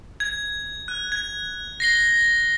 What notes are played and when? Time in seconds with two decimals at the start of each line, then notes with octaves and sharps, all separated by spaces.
0.20 G#6
0.88 F#6
1.12 G#6
1.80 A#6 C7 G7